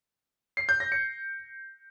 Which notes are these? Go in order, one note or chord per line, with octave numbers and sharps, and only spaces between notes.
C7
G6
A#6
C#7